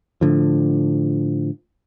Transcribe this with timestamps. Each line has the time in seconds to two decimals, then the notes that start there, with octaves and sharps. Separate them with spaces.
0.21 A2 D3 F3